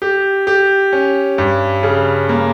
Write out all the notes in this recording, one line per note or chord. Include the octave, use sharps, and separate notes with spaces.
G4
G4
C#4
G2
C#3
A#3